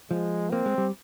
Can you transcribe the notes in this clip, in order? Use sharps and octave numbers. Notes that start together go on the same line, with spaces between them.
F3 G#3
A#3 C4
G#3
G3